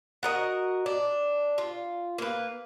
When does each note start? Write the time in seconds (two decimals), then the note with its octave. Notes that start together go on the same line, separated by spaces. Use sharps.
0.23 F#4 A#4 D#5
0.86 D4
1.58 F4
2.18 A#3 B4